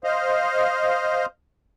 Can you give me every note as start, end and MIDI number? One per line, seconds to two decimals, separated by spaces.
0.04 1.26 72
0.04 1.26 75
0.04 1.26 77